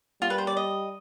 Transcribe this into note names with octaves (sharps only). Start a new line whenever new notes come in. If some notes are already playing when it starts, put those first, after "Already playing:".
G3 F4
B4
C5
D5
D#5